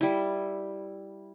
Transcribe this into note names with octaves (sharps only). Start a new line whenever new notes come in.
G3 E4